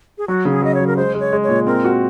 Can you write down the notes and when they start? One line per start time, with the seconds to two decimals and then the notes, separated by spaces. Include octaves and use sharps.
0.18 G#4
0.28 F#3 F#4
0.45 C#3
0.51 G#4
0.62 F#3 D#5
0.74 C#5
0.80 F#3
0.87 A#4
0.97 G#3 C5
1.14 G#3
1.20 C#5
1.33 G#3
1.43 C#5
1.49 A#2
1.67 C4 A#4
1.85 F#4